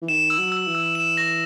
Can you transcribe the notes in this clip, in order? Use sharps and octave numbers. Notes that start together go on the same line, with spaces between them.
E3
D#3 E7
E6
F#3
E6
E3
E6
E7
A#6